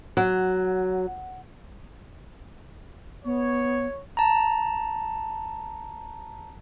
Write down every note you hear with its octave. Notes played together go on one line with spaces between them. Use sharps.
F#3
B3 C#5
A5 A#5